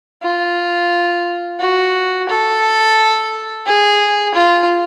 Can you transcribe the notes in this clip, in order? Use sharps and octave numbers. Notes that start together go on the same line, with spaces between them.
F4
F#4
A4
G#4
F4